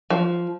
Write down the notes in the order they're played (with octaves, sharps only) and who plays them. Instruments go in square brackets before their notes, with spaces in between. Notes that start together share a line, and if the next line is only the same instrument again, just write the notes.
[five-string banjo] F3